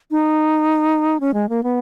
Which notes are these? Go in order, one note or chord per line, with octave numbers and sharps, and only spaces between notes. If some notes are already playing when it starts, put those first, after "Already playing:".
D#4
C#4
G#3
A#3
B3